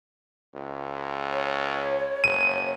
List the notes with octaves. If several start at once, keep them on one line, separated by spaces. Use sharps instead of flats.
C#2
C#5
F#1 D#7